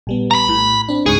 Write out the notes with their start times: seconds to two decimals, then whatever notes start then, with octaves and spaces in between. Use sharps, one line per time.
0.07 A#1 G3 B3
0.31 A#5 B5
0.49 A2
0.88 C4 D4
1.06 C#2 G#2 G#4 C#6